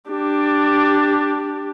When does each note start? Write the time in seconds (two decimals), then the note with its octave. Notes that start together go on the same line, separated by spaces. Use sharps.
0.10 D4 G4